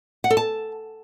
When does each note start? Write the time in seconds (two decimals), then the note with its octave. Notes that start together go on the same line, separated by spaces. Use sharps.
0.24 F#5
0.30 A4
0.37 A5